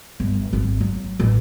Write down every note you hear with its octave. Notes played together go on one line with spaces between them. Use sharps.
G1
G#1
F#3
A1